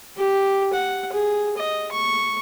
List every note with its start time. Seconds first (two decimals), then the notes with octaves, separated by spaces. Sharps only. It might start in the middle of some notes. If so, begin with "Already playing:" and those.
0.17 G4
0.73 F#5
1.13 G#4
1.57 D#5
1.92 C#6